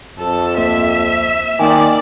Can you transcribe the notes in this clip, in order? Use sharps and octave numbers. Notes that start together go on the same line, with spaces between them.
F2 A4
D2 A#3 C5 E5
D#3 A#3 D5 G5 G#5